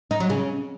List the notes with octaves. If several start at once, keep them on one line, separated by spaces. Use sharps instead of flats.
D#4
F#3
C#3